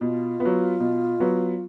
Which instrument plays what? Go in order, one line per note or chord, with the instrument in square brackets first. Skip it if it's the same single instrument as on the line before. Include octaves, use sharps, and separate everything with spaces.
[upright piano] B2 [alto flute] F4
[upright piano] B3
F#3
B2
F#3 B3